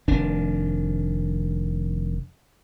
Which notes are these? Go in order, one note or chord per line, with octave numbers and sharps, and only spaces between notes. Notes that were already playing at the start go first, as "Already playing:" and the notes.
F1 D#3 D4